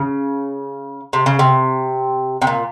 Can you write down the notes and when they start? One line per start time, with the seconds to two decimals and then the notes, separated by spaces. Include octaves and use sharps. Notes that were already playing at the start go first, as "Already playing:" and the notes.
Already playing: C#3
1.13 C3
1.26 C#3
1.39 C3
2.42 C3
2.47 A#2